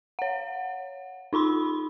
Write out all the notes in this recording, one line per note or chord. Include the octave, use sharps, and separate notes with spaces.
C#5 F#5
D#4 F4 B5 C6